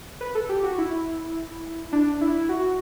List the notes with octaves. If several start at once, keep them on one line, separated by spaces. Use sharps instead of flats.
B4
A4
G4
F#4
E4
D4
E4
F#4